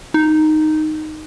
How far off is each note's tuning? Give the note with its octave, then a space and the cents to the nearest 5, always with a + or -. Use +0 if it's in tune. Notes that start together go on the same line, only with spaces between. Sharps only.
D#4 -5